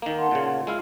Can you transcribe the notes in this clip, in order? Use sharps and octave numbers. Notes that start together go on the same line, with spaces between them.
D#3 A#3
F#5 A5 C6
A#2 C#3
F4
G#3 E4 F5